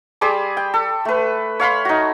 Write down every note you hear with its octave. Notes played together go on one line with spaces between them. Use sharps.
G3 G#4 C6 D6
G5
A4
A3 B4
C#5 F5 B5 C6
D#4 F#4